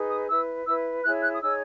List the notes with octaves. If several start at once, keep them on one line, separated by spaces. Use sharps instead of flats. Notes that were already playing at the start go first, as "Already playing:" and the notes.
Already playing: D#4 G#4 B4
D#6
E4 B4 E6
E4 B4 E6
E4 G#4 C#5 F#6
F#6
D#6
D#4 G#4 C#5 E6